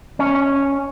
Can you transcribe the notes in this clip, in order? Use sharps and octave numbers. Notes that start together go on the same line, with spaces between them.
C#4